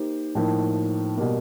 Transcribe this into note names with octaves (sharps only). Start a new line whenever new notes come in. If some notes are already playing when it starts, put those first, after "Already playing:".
Already playing: A#3 D#4 G4 C5
A2 F3 A#3 D#4
B2 G3 A#3